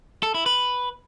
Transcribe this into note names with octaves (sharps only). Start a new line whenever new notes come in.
A4
E4
B4